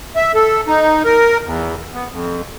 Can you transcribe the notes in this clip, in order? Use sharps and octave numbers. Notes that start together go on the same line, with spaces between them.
E5
A4
D#4
A#4
E2
B3
F2